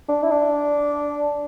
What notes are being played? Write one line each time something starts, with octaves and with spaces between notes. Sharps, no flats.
D4
E4
D4